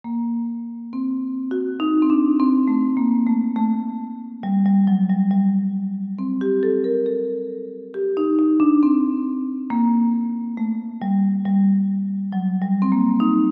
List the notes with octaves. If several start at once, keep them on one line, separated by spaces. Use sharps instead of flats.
A#3
C4
F#4
D#4
C4
D4
C4
A3
A#3
A3
A3
G3
G3
F#3
G3
G3
C4
G4
A4
A#4
A4
G4
D#4
D#4
D4
C4
A#3
A3
G3
G3
F#3
G3
C4
A#3
D#4